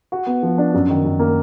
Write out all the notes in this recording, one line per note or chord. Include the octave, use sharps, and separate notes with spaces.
F#4
B3
F3
D4
F#2
D#3
F#2
A#3